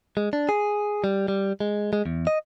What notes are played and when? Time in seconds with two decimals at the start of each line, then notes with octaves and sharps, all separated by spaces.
0.17 G#3
0.33 D4
0.49 G#4
1.04 G3
1.28 G3
1.60 G#3
1.93 G#3
2.06 E2
2.27 D#5